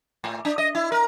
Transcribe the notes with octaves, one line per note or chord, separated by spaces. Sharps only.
A2
D4
D#5
E4
A#4